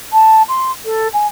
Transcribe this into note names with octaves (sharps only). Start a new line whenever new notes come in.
A5
C6
A4
G#5